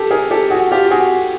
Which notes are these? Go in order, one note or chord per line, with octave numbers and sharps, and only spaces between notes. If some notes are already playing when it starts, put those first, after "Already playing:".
Already playing: G4 A4
G#4 A#4
G4 A4
F#4 G#4
F4 G4
F#4 G#4